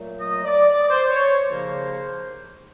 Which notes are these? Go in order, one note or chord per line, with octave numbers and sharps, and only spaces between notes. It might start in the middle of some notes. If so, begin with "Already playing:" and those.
Already playing: A#2 F#3 A3
D#5
D5
D5
C5
C#5
C5
D#2 C#3 F3 A#3